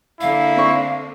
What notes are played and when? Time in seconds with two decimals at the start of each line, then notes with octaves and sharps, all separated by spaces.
0.21 D3 A#3 D4 E4 F5
0.57 C4 C#6